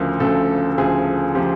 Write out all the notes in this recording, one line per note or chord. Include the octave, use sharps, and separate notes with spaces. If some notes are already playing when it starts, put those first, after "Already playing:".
Already playing: D2 C#3 F3 A#4
D2 C#3 F3 A4
A4
D2 C#3 F3 G#4
C#3 F3 G4